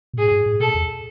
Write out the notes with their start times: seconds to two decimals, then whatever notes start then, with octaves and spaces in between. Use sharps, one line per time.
0.13 B2
0.17 A2 G#4
0.32 G#2
0.46 A2
0.60 B2 A4
0.74 E2